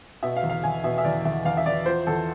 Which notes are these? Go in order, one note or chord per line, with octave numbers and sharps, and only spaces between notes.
B2 E5
F5
E2
F5
E2 G#5
B2 E5
E5
E2 D5
E2 E5
E2 F5
E5
E2 D5
F3 C5
E2 A4